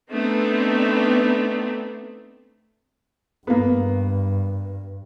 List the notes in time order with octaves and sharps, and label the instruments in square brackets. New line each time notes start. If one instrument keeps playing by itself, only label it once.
[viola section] A3 B3 C4 D4 D#4
[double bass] G2 [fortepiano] A#3 B3